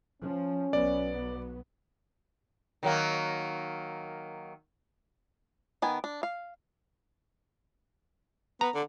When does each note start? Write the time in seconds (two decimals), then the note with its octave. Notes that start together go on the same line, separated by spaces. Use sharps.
0.22 F3 C#4
0.73 B1 F#3 B3 D5
2.83 D#3 F#3 A#3
5.82 D#3 B3 G#5
6.04 D4
6.23 F5
8.61 B3 A#5
8.75 D3